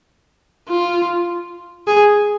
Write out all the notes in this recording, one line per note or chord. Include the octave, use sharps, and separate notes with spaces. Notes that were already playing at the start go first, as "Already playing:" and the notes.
F4
G#4